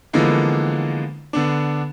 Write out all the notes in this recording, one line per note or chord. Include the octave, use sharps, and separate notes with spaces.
D3 E3 F3 G#3 A#3 B3
D3 B3 D4